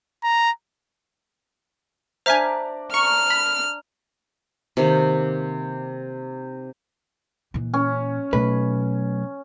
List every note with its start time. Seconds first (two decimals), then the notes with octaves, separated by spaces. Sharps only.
0.23 A#5
2.26 D4 C5 D5 E5 G#5 A#5 F6 B6
2.94 A#5 C#6 F6
3.30 B5
4.77 C3 D#3 A#3
7.54 A#2 E3
7.74 C#4
8.33 B1 B2 A3 B4